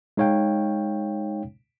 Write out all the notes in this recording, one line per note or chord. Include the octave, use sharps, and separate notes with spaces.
G#3 D#4 C#5 F5 G5